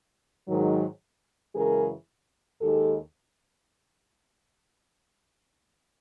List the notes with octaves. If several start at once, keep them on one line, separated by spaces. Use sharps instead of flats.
G#2 D#3 F#3
F#2 C#3 E3 G#3 G#4 A#4
D#2 D#3 G#3 G4 A4